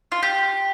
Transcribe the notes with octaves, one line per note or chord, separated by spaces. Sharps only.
F4
G4